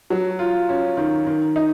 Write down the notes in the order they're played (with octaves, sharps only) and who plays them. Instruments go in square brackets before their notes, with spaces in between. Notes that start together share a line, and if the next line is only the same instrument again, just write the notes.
[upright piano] F#3
F4
C#4
D#3
D#3
D#4